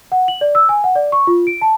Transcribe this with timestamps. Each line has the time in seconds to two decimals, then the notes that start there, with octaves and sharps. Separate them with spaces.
0.12 F#5
0.28 F#7
0.41 D5
0.55 E6
0.69 G#5
0.84 F#5
0.95 D5
1.12 C#6
1.27 F4
1.47 D7
1.61 A5